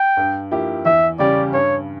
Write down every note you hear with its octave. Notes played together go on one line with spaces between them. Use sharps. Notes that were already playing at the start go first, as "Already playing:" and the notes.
Already playing: G5
G2
F3 A#3 E4 G4
E2 E5
C#3 G3 C#4 G4 D5
G2 C#5